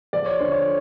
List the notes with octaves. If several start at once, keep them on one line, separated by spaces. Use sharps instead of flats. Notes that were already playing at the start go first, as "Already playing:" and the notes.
F3 D5
C#5
D3 C5
C#5